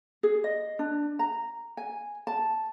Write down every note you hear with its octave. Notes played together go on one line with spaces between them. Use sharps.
G#4
D#5
D4
A#5
G#5
A5